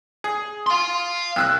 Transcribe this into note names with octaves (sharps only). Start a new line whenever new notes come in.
G#4
F5 C6
C2 E6 F#6